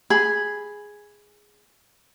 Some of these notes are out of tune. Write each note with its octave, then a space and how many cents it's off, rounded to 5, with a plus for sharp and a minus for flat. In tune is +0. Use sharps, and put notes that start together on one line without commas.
G#4 +0 B5 +0